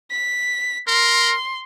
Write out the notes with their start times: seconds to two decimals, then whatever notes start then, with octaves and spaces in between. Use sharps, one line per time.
0.11 B6
0.88 A#4 C6